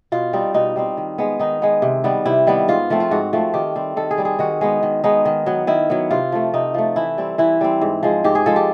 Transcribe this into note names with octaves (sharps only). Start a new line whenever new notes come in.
B2 F4
G3 C4 D#4
B2 D#4
G3 C4 D#4
D#3
G#3 B3
D#3 D#4
G#3 B3
C3
D#3 G3 B3
C3 E4
D#3 G3 B3
G#2 F4
F3 A3 C4
F4
G#2 F#4
F3 A3 C4
D#3 G4
G3 C4
D#3 A4
G#4
G3 C4
G#4
D#3 F#4
G#3 B3 D#4
D#3
G#3 B3 D#4
D#3
F#3 B3
D#3 E4
F#3 B3
C3 F4
F3 A3
C3 D#4
F3 A3
E3 E4
G3 C4
E3 E4
G3 C4
G#2
F3 G#3
G#2 G4
G#4
F3 G#3 A4
G4